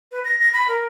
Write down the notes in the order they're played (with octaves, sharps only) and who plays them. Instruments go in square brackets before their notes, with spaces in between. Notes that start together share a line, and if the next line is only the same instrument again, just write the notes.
[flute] B4
A#6
A#6
B5
A#4